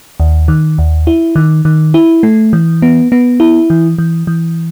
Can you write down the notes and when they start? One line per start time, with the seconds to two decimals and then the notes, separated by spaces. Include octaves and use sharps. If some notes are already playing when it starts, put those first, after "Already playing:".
0.20 D#2
0.48 D#3
0.78 D#2
1.07 E4
1.36 D#3
1.65 D#3
1.94 E4
2.23 A3
2.53 E3
2.82 B3
3.12 B3
3.40 E4
3.70 E3
3.98 E3
4.27 E3